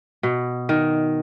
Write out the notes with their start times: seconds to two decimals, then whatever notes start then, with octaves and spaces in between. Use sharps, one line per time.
0.23 B2
0.69 D#3